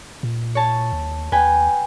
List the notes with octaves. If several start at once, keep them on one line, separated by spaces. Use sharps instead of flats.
A#2
C#5 A5
D#2
D#2 B4 G5 G#5